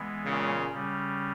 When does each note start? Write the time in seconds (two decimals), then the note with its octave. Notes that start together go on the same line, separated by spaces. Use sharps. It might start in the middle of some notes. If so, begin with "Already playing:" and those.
Already playing: E3 G#3 B3
0.23 A#2 C#3
0.71 C#3 G3 C#4